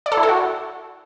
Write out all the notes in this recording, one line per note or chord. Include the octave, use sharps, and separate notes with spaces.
D5
A4
E4
A4
F#4